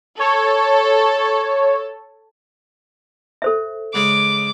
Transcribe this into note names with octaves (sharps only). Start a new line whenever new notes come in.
A4 C#5
A4 C5 E5
C#3 G#3 D6